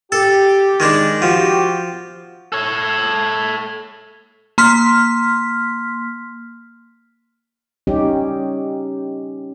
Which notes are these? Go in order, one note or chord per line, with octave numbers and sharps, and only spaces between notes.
G4 A4
D#3 G#3 D4
F3 F#4 G4
A4 C#5
A#3 C6 F6 B6
G3 C#4 D#4 G4